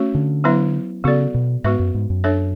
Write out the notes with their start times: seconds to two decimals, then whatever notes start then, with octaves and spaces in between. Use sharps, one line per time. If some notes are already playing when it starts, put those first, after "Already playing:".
Already playing: A3 C#4 F#4 C#5
0.15 D3
0.44 F#3 B3 E4 B4 E5
1.04 C#3 B3 F#4 A4 D5
1.34 B2
1.64 G#2 B3 F#4 B4 E5
1.79 F#2
1.94 G#2
2.10 F#2
2.24 D4 A4 C#5 E5